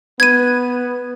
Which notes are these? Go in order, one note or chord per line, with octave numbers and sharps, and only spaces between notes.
B3 B4 G#6 D#7